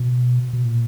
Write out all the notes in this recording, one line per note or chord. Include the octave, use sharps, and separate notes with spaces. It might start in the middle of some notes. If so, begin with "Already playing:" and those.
Already playing: B2
B2
A#2